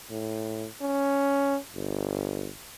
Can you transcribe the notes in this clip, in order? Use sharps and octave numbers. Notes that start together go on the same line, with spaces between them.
A2
C#4
G1